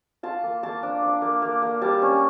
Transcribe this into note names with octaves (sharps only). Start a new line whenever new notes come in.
F4 A5
A#3
A#3 A5
D4
D4
A#3
A#3
A#3
G3 A5
C#4